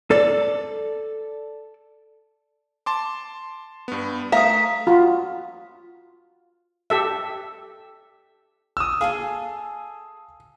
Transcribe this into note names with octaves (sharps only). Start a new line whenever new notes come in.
A4 D5
A5 C6 D6
G2 B3
A3 A#4 E5 F5 D#6 B6
F4 F#4
G4 A4 E5
D#6 E6
G#4 A4 F5 G#5